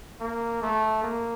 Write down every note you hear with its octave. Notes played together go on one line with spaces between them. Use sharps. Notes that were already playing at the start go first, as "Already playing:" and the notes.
A#3
A3
A#3